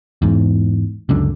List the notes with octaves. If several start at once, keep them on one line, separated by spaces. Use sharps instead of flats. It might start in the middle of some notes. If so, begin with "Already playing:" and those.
E2 G#2
C#2 F#2 D3